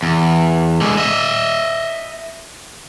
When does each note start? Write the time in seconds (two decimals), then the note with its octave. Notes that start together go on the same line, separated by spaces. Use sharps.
0.03 E2
0.81 D3 G#3
0.97 D#5 E5